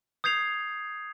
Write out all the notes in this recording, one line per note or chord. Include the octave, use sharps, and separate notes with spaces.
D#6 G6 G#6 C7 F7